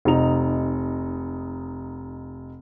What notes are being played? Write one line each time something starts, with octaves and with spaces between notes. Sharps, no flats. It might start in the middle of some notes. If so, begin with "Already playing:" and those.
F1 D#4 F7